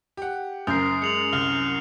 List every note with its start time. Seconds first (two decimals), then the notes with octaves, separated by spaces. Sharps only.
0.17 G4 F#5
0.67 F#1 F#2 A#4 D#6 G6 C7
1.02 G#3 C#7 F7 F#7
1.33 C2 F6